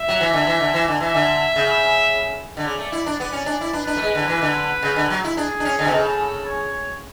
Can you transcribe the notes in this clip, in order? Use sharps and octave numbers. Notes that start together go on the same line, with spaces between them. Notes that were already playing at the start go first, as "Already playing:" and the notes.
Already playing: E5
F#3
E3
D3
E3
D3
E3
D3
E3 E5
D3
C#3
D3
C#3 D5
A3
E4
D4
B3 D5
C#4
D4
E4
D4 B4
D4
A3
G#3
D3
E3
D3
C#3
D3
F#3
E4
D4 G#4
D4
C#4
D3
B2
C#3 A4
C#5